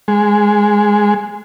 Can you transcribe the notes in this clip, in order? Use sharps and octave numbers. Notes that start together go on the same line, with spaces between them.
G#3